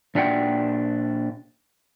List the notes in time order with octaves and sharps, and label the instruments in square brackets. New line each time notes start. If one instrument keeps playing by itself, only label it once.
[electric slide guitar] A#2 D4 E5 F#5 G5